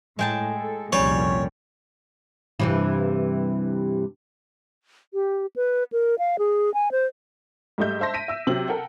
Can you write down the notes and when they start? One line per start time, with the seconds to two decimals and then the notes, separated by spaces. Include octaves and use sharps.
0.19 A2 G#3 G5 A5
0.56 A4
0.93 C2 F2 A#2 G3 C#4 C#5
2.60 G2 C3 E3
5.14 G4
5.56 B4
5.92 A#4
6.19 F5
6.39 G#4
6.74 G#5
6.92 C5
7.78 G#2 G3 A3 D#5 E5 G6
8.00 C5 E5 A5 C6 A#6
8.14 B6 D7 D#7
8.28 E5 E6
8.47 C3 F#3 C4 F#7
8.68 A4 A#4 F#5 G5